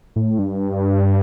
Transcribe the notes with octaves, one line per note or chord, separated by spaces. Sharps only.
A2
G2